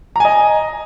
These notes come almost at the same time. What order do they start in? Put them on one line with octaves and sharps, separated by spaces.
A#5 G#5 D#5